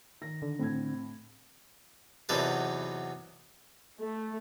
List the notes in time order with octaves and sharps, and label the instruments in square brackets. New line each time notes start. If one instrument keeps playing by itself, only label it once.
[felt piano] D#3 A#6
[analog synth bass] D3
[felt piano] A2 G#6 [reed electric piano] C4
[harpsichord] E2 C3 F#3 D#4 A4 B4
[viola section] A3